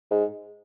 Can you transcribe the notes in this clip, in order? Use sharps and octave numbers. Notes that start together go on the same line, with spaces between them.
G#2